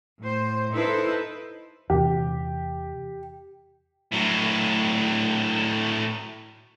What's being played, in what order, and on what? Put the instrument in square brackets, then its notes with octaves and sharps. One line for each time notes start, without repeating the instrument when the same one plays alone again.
[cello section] A2 C5
D#4 E4 A4 B4 C5
[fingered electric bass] E2 C3 [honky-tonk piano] G4
[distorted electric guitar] A2 F#3